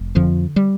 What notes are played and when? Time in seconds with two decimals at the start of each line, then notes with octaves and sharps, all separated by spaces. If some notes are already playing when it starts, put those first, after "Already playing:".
Already playing: F1
0.15 F2 D3 F3
0.56 G3